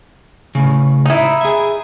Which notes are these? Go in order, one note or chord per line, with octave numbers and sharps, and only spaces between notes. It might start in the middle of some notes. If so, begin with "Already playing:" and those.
A2 C#3
D#4 E4
G#4 E5